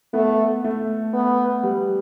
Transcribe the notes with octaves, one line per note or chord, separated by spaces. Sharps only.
A3 B3
A3
B3
G3